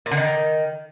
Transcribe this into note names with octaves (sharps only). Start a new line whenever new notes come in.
A#2
D3
D#3